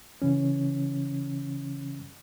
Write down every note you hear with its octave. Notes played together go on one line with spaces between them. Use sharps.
C#3 E3 C#4